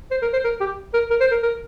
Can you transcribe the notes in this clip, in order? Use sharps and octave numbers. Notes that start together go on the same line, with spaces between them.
C5
A#4
C5
A#4
G4
A#4
A#4
C5
A#4
A#4